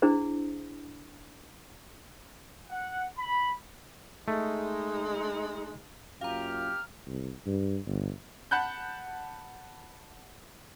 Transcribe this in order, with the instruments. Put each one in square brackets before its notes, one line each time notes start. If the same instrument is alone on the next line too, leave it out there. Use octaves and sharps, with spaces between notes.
[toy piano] D4 E4 G#4 C5
[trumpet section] F#5
B5
[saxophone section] G#3 D#4 [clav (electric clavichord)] A3
[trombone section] F#2 A#3 F4 [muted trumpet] G4 [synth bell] F5 A#5 [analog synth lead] F6
[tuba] C2
G2
G1
[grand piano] F#5 A5 B5 F#6 G6